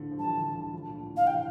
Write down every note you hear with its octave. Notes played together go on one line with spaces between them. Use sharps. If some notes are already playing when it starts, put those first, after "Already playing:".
Already playing: A2 D3 F3
F3
E3 G3 A5
D3 F3
E3
D3 F3
D3 F3
A#2
A2
G2 F5
C3 E3 G5